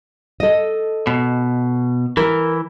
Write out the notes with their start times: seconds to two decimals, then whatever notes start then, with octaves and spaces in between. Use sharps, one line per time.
0.40 A4 D#5
1.07 B2
2.17 E3 A#4